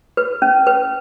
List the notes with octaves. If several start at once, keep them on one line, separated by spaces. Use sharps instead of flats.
B4
C#4
B4